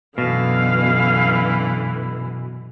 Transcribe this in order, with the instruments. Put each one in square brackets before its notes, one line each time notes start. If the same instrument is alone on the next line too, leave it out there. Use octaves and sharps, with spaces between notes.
[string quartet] F#2 D3 E3 [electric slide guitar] B2 [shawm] F5